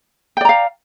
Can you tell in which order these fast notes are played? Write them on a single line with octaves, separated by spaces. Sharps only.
G5 D5 A#5 F5